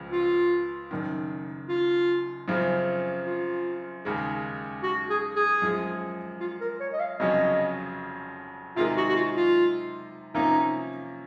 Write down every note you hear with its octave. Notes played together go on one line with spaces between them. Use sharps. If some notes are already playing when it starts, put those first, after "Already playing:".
Already playing: C#2 C#3 F3
F4
F#1 F#2 D#3
F4
F#2 C#3 F3 C4
F4
D#2 C#3 G#3
F#4
G#4
G#4
F#2 F3 G#3
F4
A#4
C#5
D#5
F5
F1 F2 C#3 F#3 C#4 D#5
C3 D#3 G#3 D#4 F4 A#4
F#4
F#4
F4
F4
C3 F3 A#3 C#4 D#4